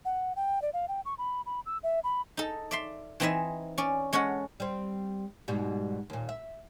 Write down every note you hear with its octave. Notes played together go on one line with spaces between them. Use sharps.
F#5
G5
D5
F5
G5
C#6
B5
B5
E6
E5
B5
D#4 A4
D5 E5 C6
E3 C4 D#4 E4 E5 G#5
C#4 D5
G#3 C#4 A4 C#5 F#5
G3 C4
G#2 B2 G3
D#2 A#2
E5